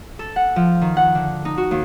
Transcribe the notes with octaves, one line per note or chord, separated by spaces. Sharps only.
A4
F#5
F3
D#3
F#5
D3
D#4
F#4
D#2